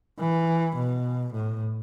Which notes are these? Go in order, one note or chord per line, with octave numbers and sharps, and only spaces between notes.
E3
B2
A2